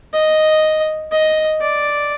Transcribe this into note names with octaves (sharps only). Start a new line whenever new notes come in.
D#5
D#5
D5